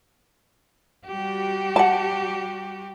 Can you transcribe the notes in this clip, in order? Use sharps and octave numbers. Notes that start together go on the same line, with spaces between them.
G3 F#4 G4
F#5 A5